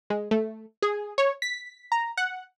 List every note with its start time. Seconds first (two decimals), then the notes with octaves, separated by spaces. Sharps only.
0.10 G#3
0.31 A3
0.82 G#4
1.18 C#5
1.42 B6
1.92 A#5
2.17 F#5